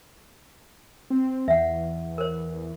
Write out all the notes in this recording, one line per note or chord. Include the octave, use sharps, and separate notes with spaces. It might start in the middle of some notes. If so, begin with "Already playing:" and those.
C4
E2 E5 F#5
A#4 C5